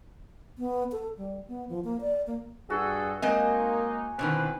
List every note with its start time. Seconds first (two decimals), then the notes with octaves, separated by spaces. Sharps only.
0.58 B3
0.92 A4
1.18 G3
1.48 B3
1.69 F3
1.84 A#3
2.01 D5
2.27 A#3
2.70 G2 F#4 G#4 A4
3.22 G#3 A#3 C4 D#4 A#4 D#5 G#5
4.19 B2 D3 D#3 B3 C4 E4 B4